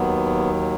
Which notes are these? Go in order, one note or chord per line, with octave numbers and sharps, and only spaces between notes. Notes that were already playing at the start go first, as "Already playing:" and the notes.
Already playing: D#2 D#3 F#3 B3